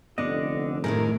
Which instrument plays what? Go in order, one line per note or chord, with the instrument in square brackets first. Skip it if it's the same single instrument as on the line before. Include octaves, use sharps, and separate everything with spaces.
[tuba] F1 [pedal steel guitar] D3 D4 D#5 [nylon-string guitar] B3
[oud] F#2 A2 A3 [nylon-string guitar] D#3 E4 G#4 [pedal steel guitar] A#4